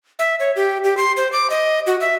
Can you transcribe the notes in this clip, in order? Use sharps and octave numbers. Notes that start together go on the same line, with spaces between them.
E5
C#5
G4
G4
C6
C5
D6
D#5
F#4
E5